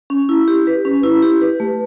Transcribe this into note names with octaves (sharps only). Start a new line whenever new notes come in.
C#4
E4
G4
B4
C#4
E4
G4
B4
A3